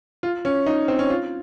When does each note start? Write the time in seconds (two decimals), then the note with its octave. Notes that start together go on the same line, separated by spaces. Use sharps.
0.23 F4
0.45 C#4
0.66 D#4
0.88 C4
0.99 C#4
1.10 F4